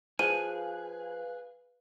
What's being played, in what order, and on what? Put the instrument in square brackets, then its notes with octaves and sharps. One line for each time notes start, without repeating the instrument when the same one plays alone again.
[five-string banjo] F3 [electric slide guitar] G#4 [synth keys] B4 F5 F#6 [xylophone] D#7